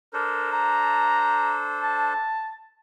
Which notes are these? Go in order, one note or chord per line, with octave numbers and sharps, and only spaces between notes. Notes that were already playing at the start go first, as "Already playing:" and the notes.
D4 A4 A#4 C5
A#5
A5